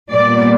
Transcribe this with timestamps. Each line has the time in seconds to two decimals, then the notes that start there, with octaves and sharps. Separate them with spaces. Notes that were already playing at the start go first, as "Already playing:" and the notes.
0.11 A#2 G3 B3 D5